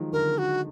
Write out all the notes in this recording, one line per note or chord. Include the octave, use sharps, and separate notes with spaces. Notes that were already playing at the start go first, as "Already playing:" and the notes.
Already playing: D#3 F3 F#3 G#3
D3 A#4
F#4